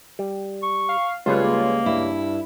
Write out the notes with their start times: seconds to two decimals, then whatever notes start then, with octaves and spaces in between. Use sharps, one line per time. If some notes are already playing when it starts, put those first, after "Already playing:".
0.19 G3
0.63 C#6
0.89 F5
1.26 C#2 G3 A3 F4 G#4 B4 C#5
1.39 A#3
1.86 G2 E4